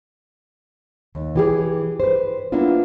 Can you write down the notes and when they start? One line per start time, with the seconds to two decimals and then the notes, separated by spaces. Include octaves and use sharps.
1.15 D#2
1.36 E3 G4 G#4
2.00 B4 C5
2.52 A#3 B3 D4 E4 F4